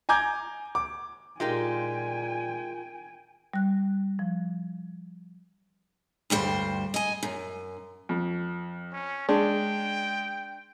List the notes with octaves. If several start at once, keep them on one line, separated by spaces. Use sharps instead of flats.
G#5 A#5 D6 G6 G#6
D6
A#2 G#3 D#4 F4 G4 A#4 G5 G#5
G3 F#6
F3
D2 G2 G3 C5
D#5 G#5
F#2
F2
C#4
G#3 D4 G5